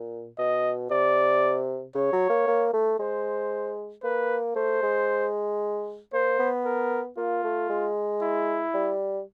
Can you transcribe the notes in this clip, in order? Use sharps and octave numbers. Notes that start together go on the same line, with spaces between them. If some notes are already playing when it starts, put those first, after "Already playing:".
Already playing: A#2
B2 D#5
C3 D5
C#3 C#5
F#3
A#3
A#3
A3
G#3 C5
A#3 B4
A3 C5
G#3
A#3 C5
B3
A#4
A#3 F4
A3
G#3
E4
G3